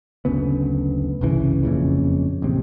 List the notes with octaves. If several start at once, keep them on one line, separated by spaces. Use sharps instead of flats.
F#1 D2 C#3 B3
G1 C2 C#3 E3
F#1 F2 A#2 C#3
A1 D#2 C3